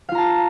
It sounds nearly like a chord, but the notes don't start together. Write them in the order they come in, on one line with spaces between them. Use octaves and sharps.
F5 F4 A#5 A5